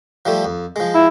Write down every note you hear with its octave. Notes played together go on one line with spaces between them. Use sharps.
F3 G3 A3
F2
F3 G#3
E4